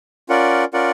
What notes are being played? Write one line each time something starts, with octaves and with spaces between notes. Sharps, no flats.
C#4 F4 A#4 D5 F#5
C#4 F4 A#4 D5 F#5